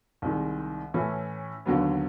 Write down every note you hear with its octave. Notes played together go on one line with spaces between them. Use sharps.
C2 C3 D#3 G#3
A2 E3 A3 C#4
D#2 D3 F#3 B3